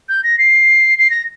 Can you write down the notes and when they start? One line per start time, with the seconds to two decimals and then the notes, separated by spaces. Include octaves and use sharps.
0.09 G6
0.24 A#6
0.39 C7
0.99 C7
1.10 A#6